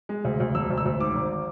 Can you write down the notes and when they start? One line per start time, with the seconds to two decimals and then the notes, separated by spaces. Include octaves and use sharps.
0.09 G#3
0.25 D2
0.40 D2
0.55 E1 E6
0.70 D2
0.78 E6
0.85 D2
1.00 G#2 D6
1.15 G#1